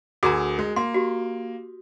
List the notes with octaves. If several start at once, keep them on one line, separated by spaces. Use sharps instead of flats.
D2 F#4 G#4 A#4 A#5 D6
G#3
A#3 C6
F#4 G4